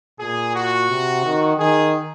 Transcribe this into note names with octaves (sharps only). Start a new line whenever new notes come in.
A#2 G#4
F#4
C3
D#3
D#3 G#4